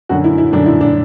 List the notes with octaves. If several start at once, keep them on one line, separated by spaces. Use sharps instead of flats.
F#2 D3 F#4
E4
E4
F#2 D3 D4
E4
D4